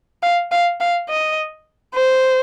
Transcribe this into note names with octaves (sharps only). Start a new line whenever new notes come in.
F5
F5
F5
D#5
C5